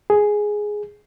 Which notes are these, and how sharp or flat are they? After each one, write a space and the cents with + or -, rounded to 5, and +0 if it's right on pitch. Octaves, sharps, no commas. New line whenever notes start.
G#4 +5